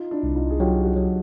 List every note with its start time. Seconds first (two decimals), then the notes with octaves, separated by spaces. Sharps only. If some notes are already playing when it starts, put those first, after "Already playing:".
Already playing: D#4 F4
0.11 D4 E4
0.23 C2
0.35 D#4 F4
0.50 G#4
0.60 F#3 F4 G4
0.84 F#4 G#4
0.96 F#3